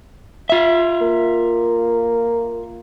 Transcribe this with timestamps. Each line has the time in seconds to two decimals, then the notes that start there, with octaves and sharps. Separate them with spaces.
0.50 F4 E5
1.01 A#3